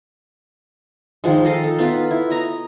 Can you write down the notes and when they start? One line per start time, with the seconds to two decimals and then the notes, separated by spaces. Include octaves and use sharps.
1.24 D#3 F3 G#3
1.45 D#4 A4 D#5 F5
1.64 A4
1.78 B3 F4 B4
2.11 E4
2.30 D#5 A#5